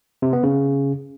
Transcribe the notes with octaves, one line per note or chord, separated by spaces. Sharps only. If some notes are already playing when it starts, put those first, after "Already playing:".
C3
B3
C#3